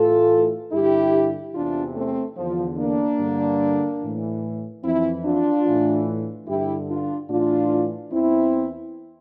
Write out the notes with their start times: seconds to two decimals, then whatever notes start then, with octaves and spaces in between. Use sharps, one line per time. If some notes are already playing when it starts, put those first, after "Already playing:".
Already playing: A2 E3 F4 A4
0.72 G2 D3 E4 G4
1.54 E2 C3 E3 D4 F4
1.96 A3 C4
2.36 E2 D3 F3
2.78 A#3 D4
3.18 G2 D3
4.01 A2 E3
4.83 F2 E3 C4 E4
5.24 D4 F4
5.66 A2 E3
6.47 G2 D3 E4 G4
6.88 D4 F4
7.29 A2 E3 D4 F4
8.12 E2 E3 C4 E4